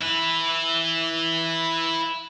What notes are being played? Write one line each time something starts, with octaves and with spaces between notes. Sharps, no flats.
E4 B4